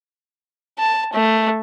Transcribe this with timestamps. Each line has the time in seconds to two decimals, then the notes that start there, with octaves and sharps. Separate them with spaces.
0.79 A5
1.13 A3